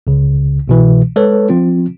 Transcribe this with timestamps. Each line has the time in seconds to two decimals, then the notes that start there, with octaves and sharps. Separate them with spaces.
0.07 C#2 C#3
0.68 C2 B2 E3
1.16 G#3 A4 B4 C#5
1.49 F3 C4 F4